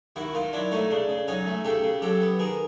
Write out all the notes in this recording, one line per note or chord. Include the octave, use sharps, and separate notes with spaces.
D#3 E4 F#4
D#3 D#4 F4
F#3 D4 E4
A3 C#4 D#4
C#3 D4
C#3
F#3 C#4 D#4
A3
C#3 G4 A4
C#3
F#3 G4 A4
B3
D#3 G#4 A#4